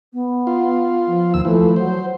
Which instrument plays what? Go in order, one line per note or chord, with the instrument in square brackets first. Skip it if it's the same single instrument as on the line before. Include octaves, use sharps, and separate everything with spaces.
[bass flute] B3
[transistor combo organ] F4
[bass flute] F3
[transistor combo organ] D#2 E6
[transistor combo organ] E3 F3 [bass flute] A3
[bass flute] F#3 [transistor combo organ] C5